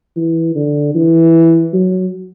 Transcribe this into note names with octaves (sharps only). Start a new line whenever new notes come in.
E3
D3
E3
F#3